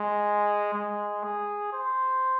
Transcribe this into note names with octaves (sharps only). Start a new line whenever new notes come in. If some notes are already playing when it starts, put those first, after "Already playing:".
Already playing: G#3
G#3
G#4
C5